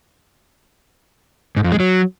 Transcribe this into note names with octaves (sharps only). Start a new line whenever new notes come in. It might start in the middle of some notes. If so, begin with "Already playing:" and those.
G#2
F2
G#3
F#3